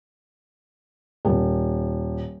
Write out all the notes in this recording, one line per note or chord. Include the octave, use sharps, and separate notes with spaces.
D#1